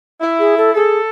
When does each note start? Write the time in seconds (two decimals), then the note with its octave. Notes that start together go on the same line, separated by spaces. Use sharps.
0.21 E4
0.39 G#4
0.57 A4
0.74 G#4 A4